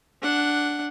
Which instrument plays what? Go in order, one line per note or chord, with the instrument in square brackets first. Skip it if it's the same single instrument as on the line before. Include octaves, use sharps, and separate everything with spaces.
[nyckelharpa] D4 F#5